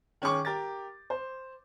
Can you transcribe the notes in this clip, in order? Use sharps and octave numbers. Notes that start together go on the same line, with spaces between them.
D#3 C#4 G#4 C#6 D6
G4 A#4 A6
C5